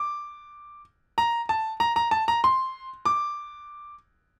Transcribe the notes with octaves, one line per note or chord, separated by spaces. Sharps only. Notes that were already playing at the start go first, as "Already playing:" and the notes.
Already playing: D6
A#5
A5
A#5
A#5
A5
A#5
C6
D6